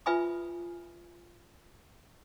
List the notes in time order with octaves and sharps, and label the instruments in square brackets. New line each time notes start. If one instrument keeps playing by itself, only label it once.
[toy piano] F4 B4 E5 G#5 B5 D#6